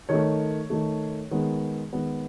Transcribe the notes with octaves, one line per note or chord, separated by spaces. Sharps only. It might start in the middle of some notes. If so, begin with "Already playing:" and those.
D#3 A3 C#5
D#3 A3
D#3 G#3 B3
D#3 G#3 B3